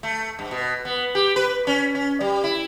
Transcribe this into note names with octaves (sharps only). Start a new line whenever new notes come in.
A3
G2
B2
B3
G4
B4
C#4
C#4
G3
E4